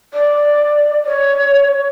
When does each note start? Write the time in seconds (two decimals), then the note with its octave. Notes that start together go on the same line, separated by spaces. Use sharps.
0.14 D5
1.05 C#5